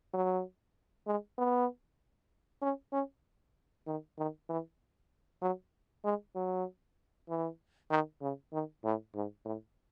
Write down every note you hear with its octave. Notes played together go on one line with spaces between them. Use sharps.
F#3
G#3
B3
C#4
C#4
D#3
D#3
E3
F#3
G#3
F#3
E3
D#3
C#3
D#3
A2
G#2
A2